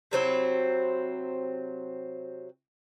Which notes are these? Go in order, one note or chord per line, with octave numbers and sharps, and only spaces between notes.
C3 F#3 C4 E4